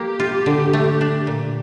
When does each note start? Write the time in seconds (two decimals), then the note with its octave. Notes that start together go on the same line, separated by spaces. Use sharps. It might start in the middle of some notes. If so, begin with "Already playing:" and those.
Already playing: F3 A#3 G4
0.20 F4
0.46 D3
0.73 A3
1.01 D4
1.27 A#2